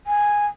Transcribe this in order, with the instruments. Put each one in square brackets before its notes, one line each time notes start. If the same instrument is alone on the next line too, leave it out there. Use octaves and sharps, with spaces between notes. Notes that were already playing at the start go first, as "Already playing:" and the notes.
[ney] G#5